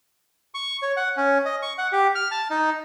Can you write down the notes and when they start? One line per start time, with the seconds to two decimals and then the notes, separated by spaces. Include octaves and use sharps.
0.54 C#6
0.82 C#5
0.97 F#5
1.17 C#4
1.45 D#5
1.62 C#6
1.78 F#5
1.92 G4
2.15 F6
2.31 A5
2.50 D#4